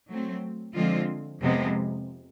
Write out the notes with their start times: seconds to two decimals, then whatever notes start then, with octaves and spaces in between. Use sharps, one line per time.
0.08 F#3 A3 C4
0.73 D3 F3 G#3 C4 F4
1.40 F2 C3 F3 G#3 B3